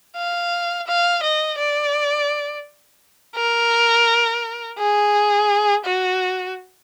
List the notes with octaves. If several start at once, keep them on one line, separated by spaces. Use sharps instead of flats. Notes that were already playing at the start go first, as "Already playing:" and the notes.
F5
F5
D#5
D5
A#4
G#4
F#4